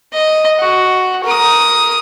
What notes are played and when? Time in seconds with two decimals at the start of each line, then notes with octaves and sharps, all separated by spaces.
0.13 D#5
0.59 F#4
1.24 A#4 D#6